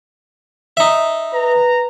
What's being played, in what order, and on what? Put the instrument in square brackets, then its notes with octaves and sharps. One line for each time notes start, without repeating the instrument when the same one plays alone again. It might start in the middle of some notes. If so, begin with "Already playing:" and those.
[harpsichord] D#4 E5
[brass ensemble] B4 A#5